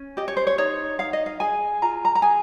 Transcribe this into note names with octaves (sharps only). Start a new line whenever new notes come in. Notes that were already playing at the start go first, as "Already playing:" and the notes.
Already playing: C#4
G4 D#5
C#5
C5
C#5
D#4 C#5
D#4 F5
D#5
F5
G#4 G#5
F4 A#5
A#5
A#5
G#4 G#5